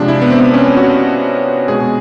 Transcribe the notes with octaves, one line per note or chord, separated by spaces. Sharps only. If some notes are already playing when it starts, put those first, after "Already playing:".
Already playing: C3 F3 G#3 D4
E4
B3
C4
C#4
F#4
B2 G#3 G#4